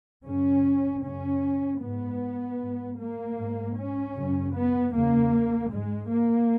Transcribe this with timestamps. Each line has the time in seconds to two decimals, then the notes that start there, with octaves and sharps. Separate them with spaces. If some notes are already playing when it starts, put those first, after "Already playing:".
0.25 F#2 C#3 C#4
1.03 F#2 C#3 C#4
1.81 G#2 B3
2.59 G#2
2.98 A#3
3.37 G#2
3.76 C#4
4.15 F#2 C#3
4.54 B3
4.93 E2 C#3 A#3
5.71 G#2 G#3
6.10 A#3